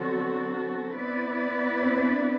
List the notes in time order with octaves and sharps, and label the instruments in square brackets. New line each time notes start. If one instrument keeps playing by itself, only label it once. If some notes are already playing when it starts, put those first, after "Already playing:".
Already playing: [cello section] D3 F#3 B3 F#4 A4 [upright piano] C4
[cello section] B3 E4 B4 D5
[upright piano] C4
C4
D4